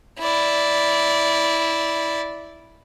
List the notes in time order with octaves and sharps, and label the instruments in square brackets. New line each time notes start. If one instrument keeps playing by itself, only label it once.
[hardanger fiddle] E4 D5